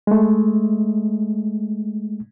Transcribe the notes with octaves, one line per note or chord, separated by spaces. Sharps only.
G#3 A3